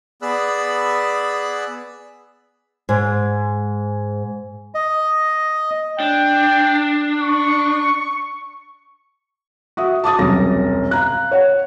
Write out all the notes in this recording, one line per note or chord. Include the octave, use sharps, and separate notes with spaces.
B3 G#4 D5 B5 E6 F#6
G#2
D#5
D4 G5
C#6
F#4 E5 D#6
A5 D6 D#6 A6
E1 C2 F#2 A#6
F5 A#5 F#6
C#5 F#5